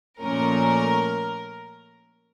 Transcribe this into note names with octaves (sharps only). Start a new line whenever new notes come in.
A#2 F3 A3 C#4 A#4